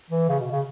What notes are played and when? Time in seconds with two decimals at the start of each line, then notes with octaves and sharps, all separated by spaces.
0.10 E3
0.28 C#3
0.40 B2
0.51 C#3